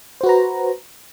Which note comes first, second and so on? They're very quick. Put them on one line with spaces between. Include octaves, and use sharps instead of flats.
C5 F#4 B4 A#5